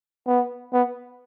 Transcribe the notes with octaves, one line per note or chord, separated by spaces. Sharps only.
B3
B3